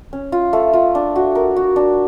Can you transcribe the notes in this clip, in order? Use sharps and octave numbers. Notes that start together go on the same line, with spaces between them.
C#4
F4
A3
F4
D4
F#4
A#4
F#4
D4